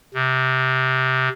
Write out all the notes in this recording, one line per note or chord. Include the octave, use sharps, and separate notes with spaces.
C3